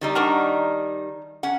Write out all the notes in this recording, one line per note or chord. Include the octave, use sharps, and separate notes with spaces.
D#3 G3 D#4
D4 F#4 A#4
C#4 F#5